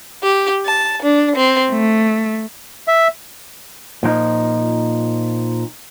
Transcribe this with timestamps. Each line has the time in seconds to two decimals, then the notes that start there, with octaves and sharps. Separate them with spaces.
0.22 G4
0.65 A5
1.02 D4
1.35 C4
1.71 A3
2.88 E5
4.03 A#2 F3 D#4